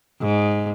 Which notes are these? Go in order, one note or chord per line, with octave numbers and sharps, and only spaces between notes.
G#2